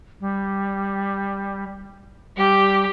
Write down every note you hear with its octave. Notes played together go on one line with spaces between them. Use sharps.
G3
G3 G4